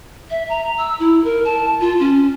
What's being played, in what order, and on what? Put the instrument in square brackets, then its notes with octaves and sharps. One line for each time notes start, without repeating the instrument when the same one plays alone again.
[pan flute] E5
A#5
E6
E4
A#4
A5
F4
C#4